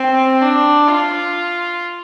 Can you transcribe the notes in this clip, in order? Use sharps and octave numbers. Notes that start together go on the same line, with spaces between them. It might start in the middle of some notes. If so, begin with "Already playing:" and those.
Already playing: C4
D4
F4